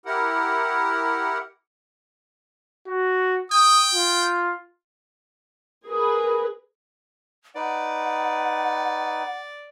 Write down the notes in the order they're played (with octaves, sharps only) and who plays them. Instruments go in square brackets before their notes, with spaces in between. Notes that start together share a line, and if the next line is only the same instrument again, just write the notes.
[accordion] E4 G4 A#4 F#5
[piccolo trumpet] F#4
[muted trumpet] G5 [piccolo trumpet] D#6
[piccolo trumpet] F4
[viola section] G#4 A#4 B4
[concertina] D#4 B4 [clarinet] D5 [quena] F#5